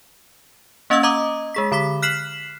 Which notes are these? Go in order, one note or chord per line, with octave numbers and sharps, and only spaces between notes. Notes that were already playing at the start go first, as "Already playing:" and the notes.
A#3 C#4 D#5 F5 E6 G#6
D#5 A#5 D6 D#6
G#3 G#4 B6
D3 B5 D6 B6
F6 F#6 B6 C7 E7 F#7